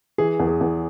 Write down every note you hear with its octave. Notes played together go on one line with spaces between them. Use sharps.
E3 G#4
E2
G#4
E2